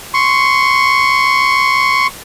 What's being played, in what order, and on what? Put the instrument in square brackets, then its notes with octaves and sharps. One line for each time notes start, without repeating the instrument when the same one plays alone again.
[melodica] C6 C#6